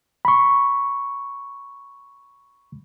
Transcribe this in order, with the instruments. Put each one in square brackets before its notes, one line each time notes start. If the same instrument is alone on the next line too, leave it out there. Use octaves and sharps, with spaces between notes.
[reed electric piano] B5 C#6